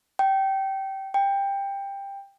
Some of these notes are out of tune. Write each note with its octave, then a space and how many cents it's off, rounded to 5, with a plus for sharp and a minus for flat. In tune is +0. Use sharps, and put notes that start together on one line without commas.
G5 -20
G5 +15